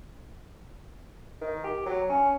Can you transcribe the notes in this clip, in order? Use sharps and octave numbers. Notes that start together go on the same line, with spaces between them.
D#3
G4
F#3
C#4